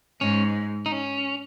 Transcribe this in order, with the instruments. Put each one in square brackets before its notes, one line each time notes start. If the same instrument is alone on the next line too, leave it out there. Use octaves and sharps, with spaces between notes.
[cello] G#2 [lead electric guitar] C#4
[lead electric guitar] D#4
C#4